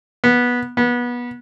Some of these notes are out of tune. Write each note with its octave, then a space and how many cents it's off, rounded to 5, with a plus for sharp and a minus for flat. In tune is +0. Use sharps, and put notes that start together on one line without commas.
B3 -15
B3 -25